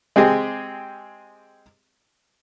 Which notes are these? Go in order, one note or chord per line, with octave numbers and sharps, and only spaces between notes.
G#3 C4 G4 G#4